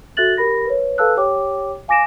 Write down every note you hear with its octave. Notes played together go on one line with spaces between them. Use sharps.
F#4 A4 E5 F#6 A6 F#7
G4 A#4 B5 A#6
B4 C#5
A4 B4 F5 A5 E6 F#6
G4 C#5 G5 D6
F5 G#5 D6 A#6 D7 E7